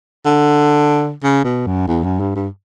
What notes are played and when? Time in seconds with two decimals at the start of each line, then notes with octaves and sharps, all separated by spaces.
0.25 D3
1.23 C#3
1.44 B2
1.66 F#2
1.87 E2
2.04 F#2
2.20 G2
2.36 G2